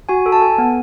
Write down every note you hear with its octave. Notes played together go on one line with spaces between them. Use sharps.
F#4 G#5
A4
A5
A4 G#5
B3